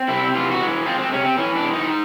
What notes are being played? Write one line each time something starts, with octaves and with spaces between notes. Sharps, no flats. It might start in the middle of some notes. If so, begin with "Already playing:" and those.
Already playing: C4
C3 E4
E3 F4
F#4
G#3
C4 F4
C4
C3 C#4
C4
E3 C#4
D4
G#3
D#4